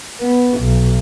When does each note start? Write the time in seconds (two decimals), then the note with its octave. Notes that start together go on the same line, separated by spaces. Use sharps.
0.21 B3
0.59 B1